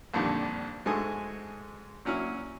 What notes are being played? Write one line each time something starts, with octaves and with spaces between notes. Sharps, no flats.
A#1 F2 A#2 D3 D#3 G3
G#2 G#3 A3 F#4 G#5 D#6
A#2 F#3 C#4 E4 F6